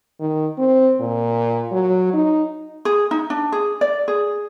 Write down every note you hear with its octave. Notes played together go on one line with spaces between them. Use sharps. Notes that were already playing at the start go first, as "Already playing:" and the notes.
D#3
C4
A#2
F#3
D#4
G#4
D#4
D4
G#4
D5
G#4